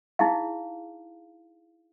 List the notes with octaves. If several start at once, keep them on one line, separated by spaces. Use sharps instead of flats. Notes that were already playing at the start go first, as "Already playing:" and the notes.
D#4 E4 G#4 F5